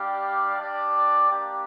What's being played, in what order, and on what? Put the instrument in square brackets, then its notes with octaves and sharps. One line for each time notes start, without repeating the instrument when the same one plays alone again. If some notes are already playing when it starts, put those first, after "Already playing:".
Already playing: [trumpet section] G3 D4 G4 D5 F5
D4 G4 D5
A#3 D4 G4